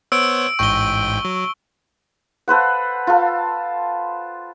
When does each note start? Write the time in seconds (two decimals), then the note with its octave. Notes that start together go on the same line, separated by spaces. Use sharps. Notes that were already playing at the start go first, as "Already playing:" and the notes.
0.12 B3 C5 C#5 E6 D7
0.59 A1 G#2 G5 C#6 G7
1.25 F#3
2.48 A4 B4 C5 F#5
3.07 F4 A4